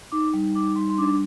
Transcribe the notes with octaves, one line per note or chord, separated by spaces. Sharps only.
D#4 D6
G3
D#4 D6
G3 C6
C6
D4 D6